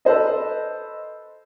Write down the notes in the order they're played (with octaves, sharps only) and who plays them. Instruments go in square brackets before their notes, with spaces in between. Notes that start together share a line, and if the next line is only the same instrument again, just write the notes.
[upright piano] A4 B4 C5 D#5